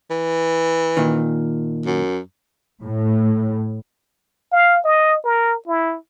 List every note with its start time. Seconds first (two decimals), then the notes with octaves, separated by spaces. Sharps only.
0.10 E3
0.97 A#2 D#3
1.86 F#2
2.82 A2
4.53 F5
4.85 D#5
5.24 A#4
5.67 E4